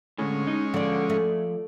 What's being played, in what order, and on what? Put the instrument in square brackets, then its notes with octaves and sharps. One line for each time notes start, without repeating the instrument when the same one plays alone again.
[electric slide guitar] A2 D3 [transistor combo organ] G#3 C#4
[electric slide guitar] D#4
[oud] D3 F4 [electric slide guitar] F3 D5
[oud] A3